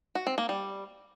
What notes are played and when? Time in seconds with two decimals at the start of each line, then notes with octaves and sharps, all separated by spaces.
0.15 F#4
0.27 C4
0.38 A#3
0.49 G3